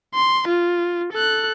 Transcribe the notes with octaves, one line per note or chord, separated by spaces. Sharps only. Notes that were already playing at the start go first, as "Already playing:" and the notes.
C6
F4
A4 F#6